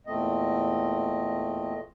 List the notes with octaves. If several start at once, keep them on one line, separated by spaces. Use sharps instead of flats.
E2 A#2 A3 C4 D#5